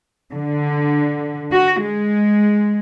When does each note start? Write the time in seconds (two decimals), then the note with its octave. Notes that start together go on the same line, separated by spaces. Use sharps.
0.35 D3
1.52 F#4
1.80 G#3